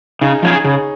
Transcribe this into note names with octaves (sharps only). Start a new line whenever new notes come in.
C#3 D#4 G#4
F3 C#4 F4 G#4
C#3 G#4 C#5